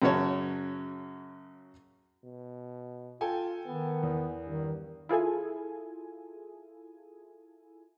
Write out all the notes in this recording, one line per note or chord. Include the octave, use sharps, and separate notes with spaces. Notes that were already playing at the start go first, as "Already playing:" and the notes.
F#2 C#3 F#4 C#5 A5
B2
F4 A4 G5 G#5
D#3 B3
E2
G2 D#3
E4 F4 G#4 A4 G#5